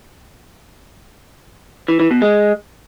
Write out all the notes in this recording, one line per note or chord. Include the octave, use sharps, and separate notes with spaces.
E3
E3
B2
G#3